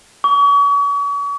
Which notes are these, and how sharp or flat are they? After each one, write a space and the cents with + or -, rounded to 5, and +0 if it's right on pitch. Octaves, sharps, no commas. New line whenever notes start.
C#6 +40